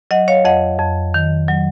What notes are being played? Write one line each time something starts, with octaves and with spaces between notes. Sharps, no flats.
F#3 D#5 F#5
C#5 F5
F2 D#5 F#5
F2
D#3
F#3